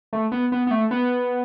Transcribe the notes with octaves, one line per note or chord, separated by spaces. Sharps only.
A3
B3
B3
B3
A3
B3